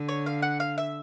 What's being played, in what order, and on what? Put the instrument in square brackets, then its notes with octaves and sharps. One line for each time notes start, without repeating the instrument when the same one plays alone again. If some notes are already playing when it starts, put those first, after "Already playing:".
Already playing: [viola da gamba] D3
[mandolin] C#5
F5
F#5
F5
E5